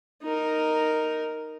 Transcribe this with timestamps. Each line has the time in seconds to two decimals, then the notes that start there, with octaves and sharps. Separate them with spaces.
0.23 D#4 A#4